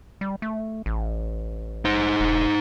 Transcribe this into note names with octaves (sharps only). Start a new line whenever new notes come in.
G3
A3
A1
D#4 C5
E1